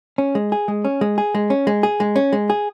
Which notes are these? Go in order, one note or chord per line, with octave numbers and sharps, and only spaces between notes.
C#4
G#3
G#4
G#3
C#4
G#3
G#4
G#3
C#4
G#3
G#4
G#3
C#4
G#3
G#4